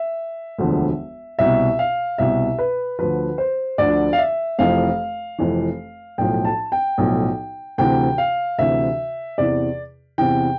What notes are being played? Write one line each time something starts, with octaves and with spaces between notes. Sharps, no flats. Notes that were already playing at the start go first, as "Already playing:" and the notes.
Already playing: E5
E1 D2 D3 F3
C2 B2 E5
F5
C2 B2 E5
B4
D2 D3 F3 B4
C5
D2 D3 F3 D5
F5
E5
F1 F2 E3 F5
F1 F2 E3
B1 A2 F3 G5
A5
G5
B1 A2 F3
D2 C3 E3 G5
F5
D2 C3 E3 E5
E2 C3 E3 D5
E2 C3 E3 G5